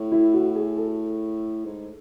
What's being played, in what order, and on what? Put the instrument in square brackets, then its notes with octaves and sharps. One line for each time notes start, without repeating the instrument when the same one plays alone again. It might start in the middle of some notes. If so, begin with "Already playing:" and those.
Already playing: [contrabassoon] A2
[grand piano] E4
F#4
G#4
A4
[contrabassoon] G#2